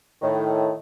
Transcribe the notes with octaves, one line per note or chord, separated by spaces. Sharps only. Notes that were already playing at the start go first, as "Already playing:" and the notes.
A2 D#3